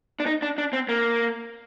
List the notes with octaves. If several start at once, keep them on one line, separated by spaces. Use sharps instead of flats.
D4
D#4
D4
D4
C4
A#3